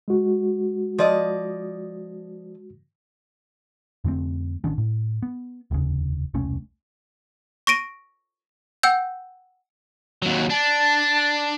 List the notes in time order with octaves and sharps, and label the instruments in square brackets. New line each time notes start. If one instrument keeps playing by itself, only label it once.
[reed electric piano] G#3 F#4
[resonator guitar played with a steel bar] F3 D5 D#5
[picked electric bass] F2 D3 A3 C4
A1 D#3 C#4 D4
A2
B3
F1 D#2 C#3
E1 C2 A3 C#4
[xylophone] C#6 A#6 D7 D#7
F#5 G5 E6 G6
[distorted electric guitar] D#2 F#3
[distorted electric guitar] D4 [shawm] A5